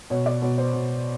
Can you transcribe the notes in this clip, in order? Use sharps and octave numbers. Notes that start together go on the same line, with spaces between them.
B2 C#5
D5
B2 C#5
C5
B2